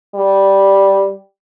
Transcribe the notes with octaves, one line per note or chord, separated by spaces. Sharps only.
G3